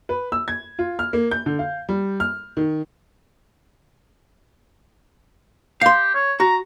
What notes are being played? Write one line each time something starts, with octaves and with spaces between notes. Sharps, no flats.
B4
E6
G#6
F4
F6
A#3
G6
D3
F5
G3
F6
D#3
G4 F5 C6
C#5
F#4 A#5